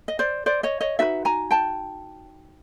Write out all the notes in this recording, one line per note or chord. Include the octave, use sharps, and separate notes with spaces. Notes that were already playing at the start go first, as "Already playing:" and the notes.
D#5
C5 D5
C5 D5
C#5 D#5
C#5 D#5
D#4 F#4 B4 D5 E5
G#5 A#5
G5 A5